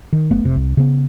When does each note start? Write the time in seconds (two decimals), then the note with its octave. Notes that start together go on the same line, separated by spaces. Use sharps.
0.13 D#3
0.31 F#1 A3 B3
0.44 F1 C3
0.56 C2
0.77 C#3 B3